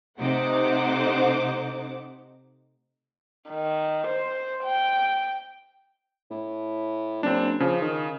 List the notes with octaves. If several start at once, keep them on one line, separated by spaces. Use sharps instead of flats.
C3 A3 D#4 C5 F#5 D6
D#3
C5
G5
A2
F#1 C4 D4
C#3 F3
D#3